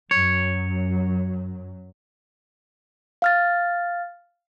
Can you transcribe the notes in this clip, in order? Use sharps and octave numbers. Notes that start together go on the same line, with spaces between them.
F#2 F#3 C#5
F5 F6 A6